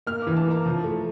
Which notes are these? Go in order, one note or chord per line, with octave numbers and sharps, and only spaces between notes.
A#3 F6
E3 D6
A5
A#3 A#5
F3
A3